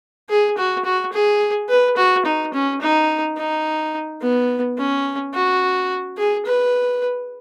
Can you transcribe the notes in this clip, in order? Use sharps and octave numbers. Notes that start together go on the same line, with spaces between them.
G#4
F#4
F#4
G#4
B4
F#4
D#4
C#4
D#4
D#4
B3
C#4
F#4
G#4
B4